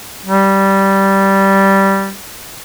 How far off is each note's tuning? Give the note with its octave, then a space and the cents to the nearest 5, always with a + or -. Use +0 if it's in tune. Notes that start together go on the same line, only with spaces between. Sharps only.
G3 -10